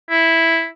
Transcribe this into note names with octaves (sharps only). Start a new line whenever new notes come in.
E4